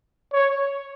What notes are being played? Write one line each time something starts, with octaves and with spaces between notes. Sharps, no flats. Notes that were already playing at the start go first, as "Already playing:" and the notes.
C#5